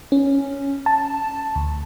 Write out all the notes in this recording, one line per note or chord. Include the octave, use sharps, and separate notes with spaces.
C#4
A5
D2